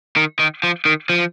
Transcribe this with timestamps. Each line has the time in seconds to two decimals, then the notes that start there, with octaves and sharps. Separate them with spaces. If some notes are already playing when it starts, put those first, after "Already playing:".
0.16 D#3
0.39 D#3
0.63 F3
0.85 D#3
1.09 F3